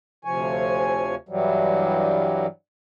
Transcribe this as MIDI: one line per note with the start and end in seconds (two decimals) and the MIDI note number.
0.25 1.15 38
0.25 1.15 48
0.25 1.15 53
0.25 1.15 73
0.25 1.15 80
1.29 2.46 43
1.29 2.46 52
1.29 2.46 54
1.29 2.46 55